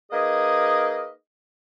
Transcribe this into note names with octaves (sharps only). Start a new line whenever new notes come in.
A#3 D#4 G#4 B4 D#5